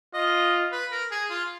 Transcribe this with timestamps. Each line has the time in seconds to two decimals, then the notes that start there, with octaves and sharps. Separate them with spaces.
0.14 F4 D#5
0.72 B4
0.92 A#4
1.11 G#4
1.30 F4